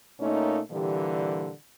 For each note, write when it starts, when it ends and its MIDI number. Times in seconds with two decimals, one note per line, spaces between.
0.20 0.59 46
0.20 0.59 57
0.20 0.59 58
0.20 0.59 61
0.20 0.59 63
0.71 1.49 46
0.71 1.49 50
0.71 1.49 52
0.71 1.49 55
0.71 1.49 67